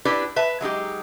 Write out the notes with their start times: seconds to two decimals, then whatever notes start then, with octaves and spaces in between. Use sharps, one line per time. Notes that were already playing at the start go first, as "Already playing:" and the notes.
0.05 D4 E4 G4 B4 D5
0.36 B4 E5 A5
0.61 F#3 G#3 D#4 G4